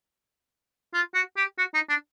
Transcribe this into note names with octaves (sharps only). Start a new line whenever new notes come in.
F4
F#4
G4
F#4
D#4
D4